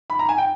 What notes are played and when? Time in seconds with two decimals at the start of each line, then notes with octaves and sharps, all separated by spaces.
0.10 B5
0.19 A#5
0.29 G#5
0.38 G5